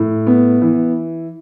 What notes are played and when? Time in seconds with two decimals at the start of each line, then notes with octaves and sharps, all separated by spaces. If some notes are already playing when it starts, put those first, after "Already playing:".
Already playing: A2
0.27 B3
0.61 E3